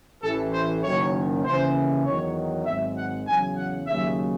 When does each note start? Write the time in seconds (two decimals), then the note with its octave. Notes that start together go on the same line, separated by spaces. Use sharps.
0.22 A1 A2 E3 A4
0.53 C5
0.83 F#1 F#2 D#3 C#5
1.44 D#2 C#3 E3 C5
2.05 E2 D#3 F#3 C#5
2.65 G#1 G#2 F#3 E5
2.96 F#5
3.26 E2 C#3 F#3 G#5
3.57 F#5
3.87 D#2 C#3 F#3 E5